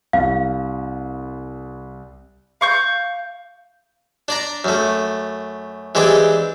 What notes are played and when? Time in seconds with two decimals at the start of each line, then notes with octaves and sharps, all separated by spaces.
0.13 C2 F5
2.61 F5 C#6 G6
4.28 D4 D5 A#5
4.65 F#2 A3
5.95 E3 G#3 C4 D4 G4